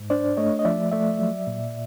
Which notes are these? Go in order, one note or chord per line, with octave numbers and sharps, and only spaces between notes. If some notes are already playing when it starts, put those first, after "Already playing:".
Already playing: G#2
D4 C5 D5
A3 C#5 D#5
D#5
F3 D5 E5
A3 D5 E5
F#3
A#2